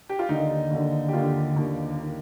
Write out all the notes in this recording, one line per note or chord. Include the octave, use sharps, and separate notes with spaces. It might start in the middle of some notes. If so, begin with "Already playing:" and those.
G4
F4
D#2 D3 D#4
D#2 D3
G4
D#2 D3 F4
D#2 D3
D#3